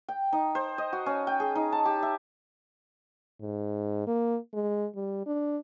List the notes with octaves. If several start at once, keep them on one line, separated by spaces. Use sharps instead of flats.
G5
D#4
C5
D#5
F#4
C#4
G5
G#4
D#4
A5
G4
E5
G#2
A#3
G#3
G3
D4